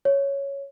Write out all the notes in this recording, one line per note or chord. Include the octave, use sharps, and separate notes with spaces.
C#5